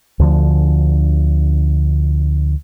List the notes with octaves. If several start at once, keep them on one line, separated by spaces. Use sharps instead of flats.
D2 D3 F3